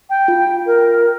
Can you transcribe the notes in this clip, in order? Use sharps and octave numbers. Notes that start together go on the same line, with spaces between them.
G5
F4
A#4